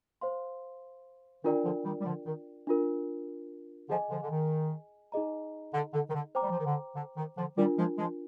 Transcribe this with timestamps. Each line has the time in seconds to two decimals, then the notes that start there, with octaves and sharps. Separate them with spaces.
0.21 C5 F5 C6
1.44 D#3 D4 F4 A#4 D5 G5
1.65 D3 F3
1.85 D#3 G3
2.01 G3
2.05 D3 F3
2.26 D#3
2.67 D4 F4 A#4
3.89 D3 F3 G#4 D#5 G#5
4.10 D3 F3
4.23 D3
4.30 D#3
5.12 D#4 G#4 D#5 A#5
5.74 D3
5.94 D3
6.10 D#3
6.14 D3
6.35 C5 G5 A#5 D6
6.43 G3
6.51 F3
6.59 D#3
6.66 D3
6.96 D3
7.17 D#3
7.37 D3 F3
7.57 D#3 G3 D4 F4 A#4
7.78 F3 G#3
7.98 F3 G#3